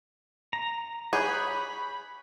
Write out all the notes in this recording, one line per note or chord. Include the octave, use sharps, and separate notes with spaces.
A#5
G#4 C#5 B5 F#6 G6